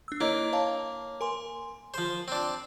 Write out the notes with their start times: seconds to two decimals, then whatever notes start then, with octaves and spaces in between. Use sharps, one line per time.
0.08 D4 E6
0.21 A#3 E4 C#5 D#5
0.53 C#5 F5 A5
1.21 A#4 G#5 C6
1.94 F3 C5
2.28 C4 D4